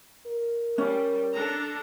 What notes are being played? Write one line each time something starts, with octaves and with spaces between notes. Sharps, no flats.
A#4
G3 C#4
D4 A4 A#5